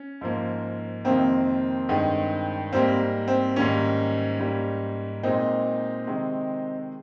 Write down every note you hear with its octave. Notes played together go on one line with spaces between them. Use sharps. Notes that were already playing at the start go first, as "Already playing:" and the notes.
Already playing: C#4
G#2 F3 A#3
F2 C3 D#3 A#3 C4
G2 D#3 G#3
G#2 G3 A#3 C4
C4
G#2 D#3 G3 A#3 C#4
G#2 G3 A#3
A#2 G#3 C4 D#4
C3 D#3 G#3